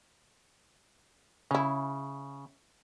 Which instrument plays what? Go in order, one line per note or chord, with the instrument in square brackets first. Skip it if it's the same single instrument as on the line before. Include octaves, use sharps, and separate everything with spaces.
[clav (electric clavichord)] C#3 [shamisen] C#4 E4